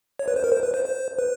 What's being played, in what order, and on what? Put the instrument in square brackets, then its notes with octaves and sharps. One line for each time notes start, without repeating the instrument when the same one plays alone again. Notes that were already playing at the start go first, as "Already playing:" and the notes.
[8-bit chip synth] C#5
B4
C5
A#4
C5
B4
C5
C5
B4